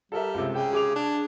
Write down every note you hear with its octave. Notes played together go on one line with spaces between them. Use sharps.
G3 A4 A#4 E5
C#2 C3
C#3 G5
G#4 D6 F7
D4